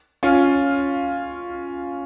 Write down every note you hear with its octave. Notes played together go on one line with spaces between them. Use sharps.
C#4 F4